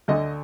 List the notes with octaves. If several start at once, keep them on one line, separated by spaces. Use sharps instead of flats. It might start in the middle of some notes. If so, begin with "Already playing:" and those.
D2 D3 D#5